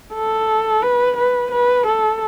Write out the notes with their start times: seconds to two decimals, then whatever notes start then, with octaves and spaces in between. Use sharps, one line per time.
0.14 A4
0.83 B4
1.17 B4
1.52 B4
1.86 A4